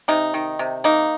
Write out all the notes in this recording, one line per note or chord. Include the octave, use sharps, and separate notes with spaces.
C3 D#4
D#3
C3
A#3 D#4